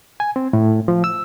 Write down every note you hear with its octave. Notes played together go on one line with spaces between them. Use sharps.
G#5
C4
A2
F3
E6